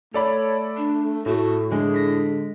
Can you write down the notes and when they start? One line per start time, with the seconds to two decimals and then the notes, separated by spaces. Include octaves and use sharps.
0.14 A3 A4 C#5 D5 B5
0.77 D4
1.26 A2 A3 F#4
1.71 D3 G#3 G#4
1.94 A#6 B6